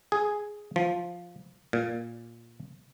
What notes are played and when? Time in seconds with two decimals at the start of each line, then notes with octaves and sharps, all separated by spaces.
0.12 G#4
0.76 F3
1.73 A#2